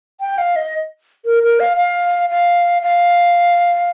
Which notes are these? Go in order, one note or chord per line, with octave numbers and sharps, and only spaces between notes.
G5
F5
D#5
A#4
A#4
F5
F5
F5
F5